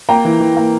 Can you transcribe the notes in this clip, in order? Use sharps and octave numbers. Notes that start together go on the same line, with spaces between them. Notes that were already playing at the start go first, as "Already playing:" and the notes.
A#3 G5 A#5
E3
E3
A#3